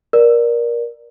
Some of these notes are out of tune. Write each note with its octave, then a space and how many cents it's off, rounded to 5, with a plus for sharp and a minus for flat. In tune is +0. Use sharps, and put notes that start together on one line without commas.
A#4 +20 D5 +10